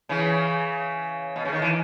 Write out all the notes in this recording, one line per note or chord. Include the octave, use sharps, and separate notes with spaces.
C#3 E3
B2
C#3
D#3
E3